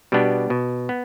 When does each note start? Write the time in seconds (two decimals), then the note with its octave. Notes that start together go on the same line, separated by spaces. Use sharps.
0.12 B2 G3 B3 D4
0.50 B2
0.89 B3